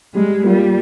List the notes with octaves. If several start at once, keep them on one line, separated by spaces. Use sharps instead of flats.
G3 G#3
G3 A#3 F4